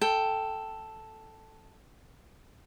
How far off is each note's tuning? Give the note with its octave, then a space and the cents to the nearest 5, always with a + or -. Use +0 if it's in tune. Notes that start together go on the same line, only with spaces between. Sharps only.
A4 +0 G5 +0